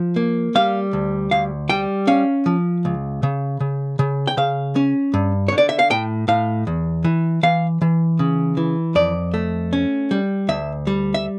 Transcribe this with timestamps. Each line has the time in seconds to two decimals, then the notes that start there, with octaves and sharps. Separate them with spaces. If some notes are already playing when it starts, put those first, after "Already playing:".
Already playing: F3
0.16 A#3
0.55 G3 F5
0.93 D2
1.31 D2 F5
1.69 G3 G5
2.07 C#4 F5
2.46 F3
2.85 C#2
3.23 C#3
3.60 C#3
3.99 C#3
4.27 G5
4.37 C#3 F5
4.76 C#4
5.14 G2
5.48 D3 C#5
5.58 D5
5.69 E5
5.79 F5
5.90 A2 G5
6.28 A2 F5
6.67 E2
7.04 E3
7.43 E3 F5
7.81 E3
8.19 C#3
8.57 E3
8.95 F2 D5
9.34 A3
9.73 C#4
10.11 G3
10.49 D2 E5
10.87 G3
11.14 E5